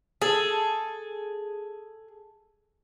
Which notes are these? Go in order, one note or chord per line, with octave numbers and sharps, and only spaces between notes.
G#4 A4